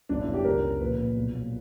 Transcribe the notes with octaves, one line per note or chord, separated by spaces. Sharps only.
G1 D4
E4
F#2
G4
C#2 A#4
C#3
A#1 B4
A#2
B1
A#2